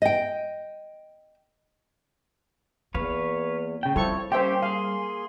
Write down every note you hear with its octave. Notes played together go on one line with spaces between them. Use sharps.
D#5 G5
E2 A#3 B4 C#5 F5
C#3 G5
F3 G3 C4 E4 A4 C#5 C#6
A#3 C#4 G4 C5 E5 G5 C6
G#4 F5